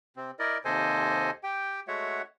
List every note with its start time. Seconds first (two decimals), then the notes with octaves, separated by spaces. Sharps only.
0.16 C3 C4
0.39 E4 A#4 D5 D#5
0.65 D#2 C3 A4 C5 D#5 G#5
1.43 G4 G5
1.88 G#3 A3 F#4 C#5 E5 F#5